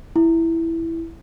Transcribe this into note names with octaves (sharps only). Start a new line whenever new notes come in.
E4